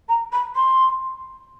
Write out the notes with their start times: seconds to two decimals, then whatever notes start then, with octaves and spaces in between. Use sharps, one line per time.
0.08 A#5
0.32 B5
0.55 C6